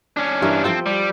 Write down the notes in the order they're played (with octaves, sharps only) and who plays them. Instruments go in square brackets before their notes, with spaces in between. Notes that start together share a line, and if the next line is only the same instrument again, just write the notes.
[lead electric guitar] C#4 D4
[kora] G2 E3 A#4
[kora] F3 A4 G5 [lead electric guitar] C4
[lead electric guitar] G3